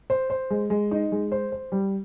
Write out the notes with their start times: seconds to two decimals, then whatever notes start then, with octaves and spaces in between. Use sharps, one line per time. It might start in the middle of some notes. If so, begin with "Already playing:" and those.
0.10 C5
0.30 C5
0.50 G#3
0.70 G#3
0.91 D#4
1.12 G#3
1.32 C5
1.52 C5
1.72 G3